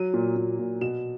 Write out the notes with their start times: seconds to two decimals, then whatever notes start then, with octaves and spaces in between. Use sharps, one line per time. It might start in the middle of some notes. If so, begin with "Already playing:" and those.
Already playing: F#3 D#7
0.14 A#2
0.36 A#2
0.59 A#2
0.81 B2 E7